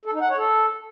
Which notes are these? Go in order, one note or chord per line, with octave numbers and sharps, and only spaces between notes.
A4
D#4
F#5
C#5
A4